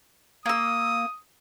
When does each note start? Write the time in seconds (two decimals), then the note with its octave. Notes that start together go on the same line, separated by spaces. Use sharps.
0.46 A#3 D#6 E6